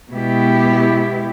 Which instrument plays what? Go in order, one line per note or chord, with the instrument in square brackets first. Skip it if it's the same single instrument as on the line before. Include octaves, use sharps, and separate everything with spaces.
[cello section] B2 G#3 B3 E4 G4